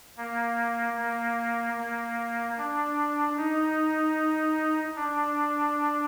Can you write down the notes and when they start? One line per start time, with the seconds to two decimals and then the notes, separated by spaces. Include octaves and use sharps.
0.18 A#3
0.97 A#3
1.78 A#3
2.58 D4
3.37 D#4
4.96 D4